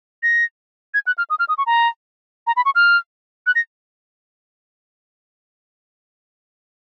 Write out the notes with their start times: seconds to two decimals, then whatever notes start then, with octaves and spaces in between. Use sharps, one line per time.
0.23 A#6
0.94 G#6
1.07 F#6
1.18 F6
1.30 D#6
1.39 F6
1.49 D#6
1.58 C#6
1.66 A#5
2.47 A#5
2.56 B5
2.65 C#6
2.75 F6
3.47 F#6
3.55 A#6